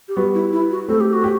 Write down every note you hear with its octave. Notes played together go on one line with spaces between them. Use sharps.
G4
G3 B3 F#4
E4
E4
F#4
A3 C4 A4
G4
F#4
G4